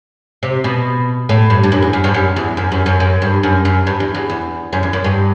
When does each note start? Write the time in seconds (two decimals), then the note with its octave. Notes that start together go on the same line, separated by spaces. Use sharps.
0.43 C3
0.64 B2
1.29 A2
1.50 G2
1.63 G2
1.72 F#2
1.82 E2
1.93 F#2
2.04 G2
2.14 F#2
2.36 E2
2.57 F#2
2.72 F#2
2.86 F#2
3.00 F#2
3.22 G2
3.43 F#2
3.65 F#2
3.87 G2
4.00 E2
4.14 E2
4.29 E2
4.73 F#2
4.83 E2
4.93 F#2
5.04 G2